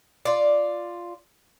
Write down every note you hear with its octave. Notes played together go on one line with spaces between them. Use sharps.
F4 D5